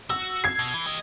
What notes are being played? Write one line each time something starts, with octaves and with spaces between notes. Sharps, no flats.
F#4 E6
G#6 C7
B2
E3
G4 D#5